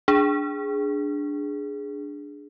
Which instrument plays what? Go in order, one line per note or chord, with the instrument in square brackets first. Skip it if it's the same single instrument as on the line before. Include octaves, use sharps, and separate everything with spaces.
[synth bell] D4 G#4